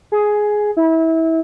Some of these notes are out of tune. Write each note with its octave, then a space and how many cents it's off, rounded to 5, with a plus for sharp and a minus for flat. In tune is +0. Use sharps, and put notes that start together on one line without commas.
G#4 +10
E4 -25